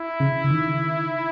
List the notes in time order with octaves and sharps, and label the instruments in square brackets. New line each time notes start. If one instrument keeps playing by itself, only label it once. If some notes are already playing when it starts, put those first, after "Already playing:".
Already playing: [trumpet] E4
[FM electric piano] C#3
C#3
D#3